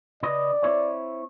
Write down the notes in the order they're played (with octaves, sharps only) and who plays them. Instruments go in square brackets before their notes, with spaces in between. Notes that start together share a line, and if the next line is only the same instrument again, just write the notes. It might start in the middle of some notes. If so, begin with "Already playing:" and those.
[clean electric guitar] C#3 B4 D#5 [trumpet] D5
[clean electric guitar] C4 E4 C#5